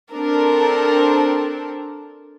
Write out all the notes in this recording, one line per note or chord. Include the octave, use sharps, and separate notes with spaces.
C4 D4 A4 A#4